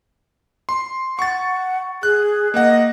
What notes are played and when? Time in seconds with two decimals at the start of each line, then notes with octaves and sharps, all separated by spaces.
0.69 C6
1.19 F#5 C#6 A6
2.03 G#4 F#6
2.54 A#3 D#5 F#5